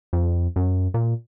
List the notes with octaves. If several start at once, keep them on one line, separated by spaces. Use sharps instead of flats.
F2
F#2
A#2